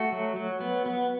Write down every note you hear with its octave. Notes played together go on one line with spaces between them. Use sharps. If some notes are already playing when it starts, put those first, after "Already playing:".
Already playing: A3 F#4
F#3
F#3
B3
B3